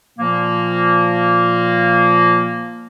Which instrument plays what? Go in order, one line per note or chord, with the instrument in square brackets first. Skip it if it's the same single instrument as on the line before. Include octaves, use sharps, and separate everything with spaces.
[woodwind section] A#2 F3 A#3